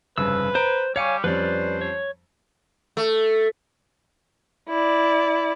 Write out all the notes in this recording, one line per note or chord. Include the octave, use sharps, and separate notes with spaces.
F1 G2 C#3 B4 E6
C5 A#5 D7
G3 C#5 F5 G#5 C#6 C#7
F2 G3 C#4 B4 C5 D5
C#5
A3
E4 D5